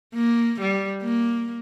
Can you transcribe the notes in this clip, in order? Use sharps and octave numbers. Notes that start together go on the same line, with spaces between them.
A#3
G3
A#3